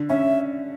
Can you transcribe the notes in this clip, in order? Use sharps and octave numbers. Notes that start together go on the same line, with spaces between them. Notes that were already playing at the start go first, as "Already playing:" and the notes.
Already playing: D3
C#4 E5